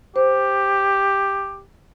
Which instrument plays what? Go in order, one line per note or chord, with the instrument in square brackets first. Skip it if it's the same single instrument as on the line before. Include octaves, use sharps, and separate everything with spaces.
[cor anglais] G4 [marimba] C5